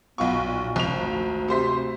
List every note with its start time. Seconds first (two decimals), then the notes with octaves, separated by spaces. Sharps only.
0.18 B1 B3 F4 C#6
0.40 A#2
0.76 G#1 F7
0.92 D2
1.48 C3 C5 B6